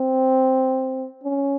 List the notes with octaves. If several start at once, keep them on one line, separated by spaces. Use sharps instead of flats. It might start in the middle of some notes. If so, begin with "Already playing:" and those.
Already playing: C4
C#4